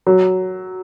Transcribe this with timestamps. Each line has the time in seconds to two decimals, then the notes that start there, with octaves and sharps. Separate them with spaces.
0.07 F#3